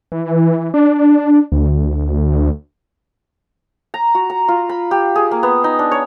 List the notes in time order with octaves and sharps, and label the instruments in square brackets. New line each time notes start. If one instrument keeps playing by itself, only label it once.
[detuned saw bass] E3
D4
D2
[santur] A#5
F#4
A#5
F4
B5
G4
G#4
A#3
B3
D#4
D4
C#5